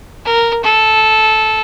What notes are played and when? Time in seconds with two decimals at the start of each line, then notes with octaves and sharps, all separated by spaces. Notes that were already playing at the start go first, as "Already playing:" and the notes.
0.25 A#4
0.64 A4